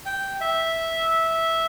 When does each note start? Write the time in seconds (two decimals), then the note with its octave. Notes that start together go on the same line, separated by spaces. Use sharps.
0.06 G5
0.41 E5